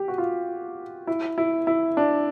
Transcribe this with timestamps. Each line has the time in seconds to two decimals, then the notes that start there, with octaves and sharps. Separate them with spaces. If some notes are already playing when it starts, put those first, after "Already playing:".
Already playing: G4
0.08 F#4
0.18 F4
1.07 E4
1.38 E4
1.67 E4
1.97 D4